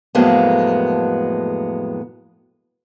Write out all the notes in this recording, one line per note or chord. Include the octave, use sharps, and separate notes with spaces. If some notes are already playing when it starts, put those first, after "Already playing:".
F2 A2 F#3 G#3 A#3 B3